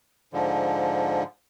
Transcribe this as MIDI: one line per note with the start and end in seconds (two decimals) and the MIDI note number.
0.33 1.23 44
0.33 1.23 50
0.33 1.23 53